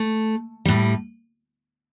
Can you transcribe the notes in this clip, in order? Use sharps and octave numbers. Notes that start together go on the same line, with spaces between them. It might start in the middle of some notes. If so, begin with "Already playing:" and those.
Already playing: A3
A2 G3